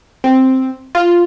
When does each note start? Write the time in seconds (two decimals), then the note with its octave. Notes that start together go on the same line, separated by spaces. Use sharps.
0.24 C4
0.95 F4